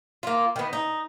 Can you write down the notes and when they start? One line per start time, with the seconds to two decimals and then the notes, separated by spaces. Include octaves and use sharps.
0.23 A#3 F4
0.56 D#3 B3
0.73 D#4